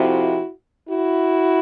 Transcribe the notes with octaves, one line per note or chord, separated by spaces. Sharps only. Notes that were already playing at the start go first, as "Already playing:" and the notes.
Already playing: F2 C3 F3 E4 F#4
E4 F#4